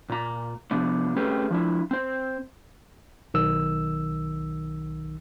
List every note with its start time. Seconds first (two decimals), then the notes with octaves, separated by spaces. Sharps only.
0.09 A#2 A#5
0.71 C3 F3 B3 D4
1.16 A3 C4 C#4 G4 G#4 B4
1.51 F3 D4 E4
1.91 C4 C5
3.34 B1 D#3 E6